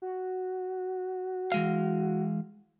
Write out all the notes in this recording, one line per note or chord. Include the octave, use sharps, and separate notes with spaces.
F#4
E3 G#3 F5